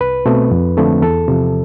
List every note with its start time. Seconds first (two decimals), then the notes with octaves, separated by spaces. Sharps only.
0.01 C2 B4
0.26 B2 A3 C4
0.51 F2
0.77 D3 F3 A3 C4
1.02 E2 A4
1.28 C3 F3